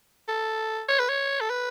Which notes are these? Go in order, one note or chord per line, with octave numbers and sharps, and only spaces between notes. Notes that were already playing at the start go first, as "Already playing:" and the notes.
A4
C#5
B4
C#5
A4
B4